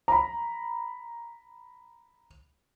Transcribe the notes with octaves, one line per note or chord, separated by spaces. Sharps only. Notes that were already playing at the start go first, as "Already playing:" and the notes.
A#5 B5